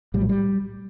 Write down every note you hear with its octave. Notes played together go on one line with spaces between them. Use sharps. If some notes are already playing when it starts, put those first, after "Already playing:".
A#1 A2 G3
F#3
G3